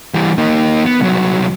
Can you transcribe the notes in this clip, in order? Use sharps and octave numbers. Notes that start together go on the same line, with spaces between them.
E3 G3
A#3 D#4
B3
C2 F#3